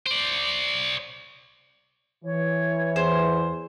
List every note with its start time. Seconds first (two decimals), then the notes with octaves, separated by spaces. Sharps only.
0.06 C5 D5
2.25 E3 C#5
2.96 E2 C5